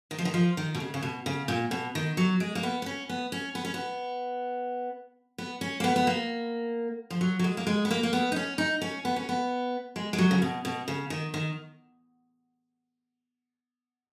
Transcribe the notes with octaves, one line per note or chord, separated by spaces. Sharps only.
D#3
F3
D#3
F3
D#3
B2
C#3
C#3
B2
C#3
A#2
B2
D#3
F#3
G#3
A#3
B3
B3
C#4
B3
C#4
B3
C#4
B3
B3
C#4
A#3
B3
B3
A#3
F3
F#3
F#3
G#3
A#3
G#3
B3
A#3
A#3
B3
D#4
C#4
D#4
C#4
B3
C#4
B3
G#3
G#3
F#3
C#3
B2
B2
C#3
D#3
D#3